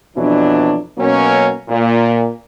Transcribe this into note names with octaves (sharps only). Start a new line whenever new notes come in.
F2 B2 E3 F#3 D4
B2 F#3 A#3 C#4
A#2